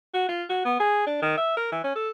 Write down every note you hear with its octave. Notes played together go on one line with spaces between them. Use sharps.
F#4
F4
F#4
B3
G#4
D4
D#3
E5
A#4
E3
C#4
A4